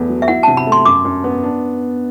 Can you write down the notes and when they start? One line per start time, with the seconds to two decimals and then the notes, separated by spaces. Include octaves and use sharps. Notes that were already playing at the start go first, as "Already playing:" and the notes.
Already playing: E2 A3 B3
0.09 F#3
0.22 E5
0.28 E4 F#5
0.43 C3 A5
0.57 B5
0.67 A3
0.72 C6
0.85 F#2 D6
1.05 F#2
1.24 B3
1.43 D4